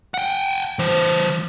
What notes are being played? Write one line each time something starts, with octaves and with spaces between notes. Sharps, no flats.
F#5 G5
E3 C5